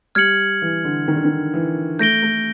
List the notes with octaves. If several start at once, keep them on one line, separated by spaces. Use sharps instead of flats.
G3 F6 G#6 C#7 F#7
E3
D3
D#3
D3
D#3
E3
A3 G6 A#6 D7 G7
A3